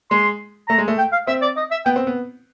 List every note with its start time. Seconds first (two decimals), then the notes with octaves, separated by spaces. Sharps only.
0.11 G#3 C6
0.69 A3 A#5
0.78 G#3
0.88 A3
0.98 G5
1.12 F5
1.27 C4 E5
1.42 D5
1.57 D#5
1.71 E5
1.86 B3 G5
1.96 C4
2.07 B3